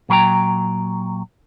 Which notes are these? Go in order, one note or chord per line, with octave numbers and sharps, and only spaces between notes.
A#2 F#3 A#4 G5 A#5